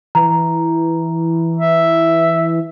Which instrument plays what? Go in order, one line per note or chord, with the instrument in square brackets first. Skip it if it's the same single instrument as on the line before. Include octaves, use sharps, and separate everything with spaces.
[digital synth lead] E3 [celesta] A#5
[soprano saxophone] E5